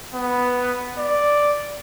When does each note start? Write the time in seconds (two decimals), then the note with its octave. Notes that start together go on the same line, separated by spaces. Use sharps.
0.14 B3
0.98 D5